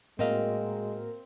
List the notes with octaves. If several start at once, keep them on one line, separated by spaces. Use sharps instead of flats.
A2 G#3 A#3 C4 F#4 A#4 D#5 F5